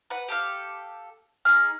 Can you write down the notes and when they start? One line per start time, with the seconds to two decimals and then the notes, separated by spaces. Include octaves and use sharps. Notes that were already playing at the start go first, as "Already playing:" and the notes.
0.10 B4 F#5
0.28 G4 A4 F5
1.45 D#4 F#4 G#4 F6